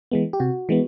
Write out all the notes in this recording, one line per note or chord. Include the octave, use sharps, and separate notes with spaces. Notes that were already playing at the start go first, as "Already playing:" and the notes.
E3 G#3 B3
G4
C3 F#4
E3 G#3 B3